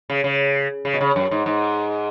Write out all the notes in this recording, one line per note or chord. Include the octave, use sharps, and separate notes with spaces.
C#3
C#3
C#3
B2
C#3
F#2
G#2
G#2